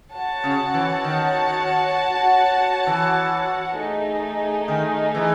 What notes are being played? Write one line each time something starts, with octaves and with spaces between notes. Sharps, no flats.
F#4 C#5 F#5 A5
C#3
E3
D#3
E3
A3 D#4 G#4
D#3
E3